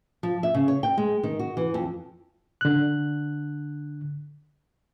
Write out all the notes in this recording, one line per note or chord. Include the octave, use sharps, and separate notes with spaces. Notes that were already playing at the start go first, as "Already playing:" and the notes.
F3
E5
C#3
C#5
G5
G#3
D#3
F#4
E3
F2
D3 F#6